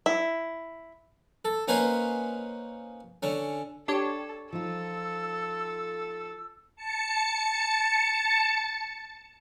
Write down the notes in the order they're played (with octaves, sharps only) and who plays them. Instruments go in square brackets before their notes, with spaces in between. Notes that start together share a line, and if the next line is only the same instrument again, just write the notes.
[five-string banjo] E4
[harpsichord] A4
A#3 C#4 D#4 B4 C5 G#5
D3 C#4
[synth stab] D4 G4 C#5 [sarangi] A4
[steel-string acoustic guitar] F3 D#4 F4 [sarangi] A4 [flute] E6
[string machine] A5 C#7